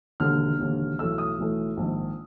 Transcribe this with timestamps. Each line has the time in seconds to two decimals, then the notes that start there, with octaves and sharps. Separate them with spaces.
0.20 E1 D#2 D3 F6
0.59 E1 D#2 D3
0.99 B1 A2 E3 A3 E6
1.18 D#6
1.38 B1 A2 E3 A3
1.77 A#1 G#2 D#3